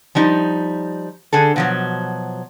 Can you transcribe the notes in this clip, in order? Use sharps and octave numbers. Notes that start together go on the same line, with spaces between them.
F3 G3 D#4
D3 G#4 A4
B2 F3 F#3